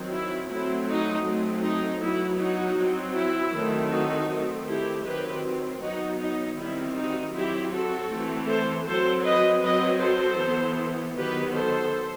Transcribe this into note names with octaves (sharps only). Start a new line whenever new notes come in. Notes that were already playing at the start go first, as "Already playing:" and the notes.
Already playing: D#3 F#3 C4
E4
F#3 A3 C4 E4
D#4 F#4
F#3 A3 C4
D#4
F#3 B3 E4
D#4 F#4
F#3 C4
E4
D#3 F#3 A3 C4
D#4 F#4
D#3 A3 C4
E4 G4
D#3 F#3 C4 G4 B4
F#3 B3 D#4 F#4
D#4
D#3 G3 C4 E4
D#4 F#4
F#3 C4 E4 G4
F#4 A4
E3 A3 C4
A4 C5
F#3 C4 A4 C5
B4 D#5
F#3 C4 B4 D#5
A4 C5
E3 B3
D#3 F#3 B3 G4 B4
A4 C5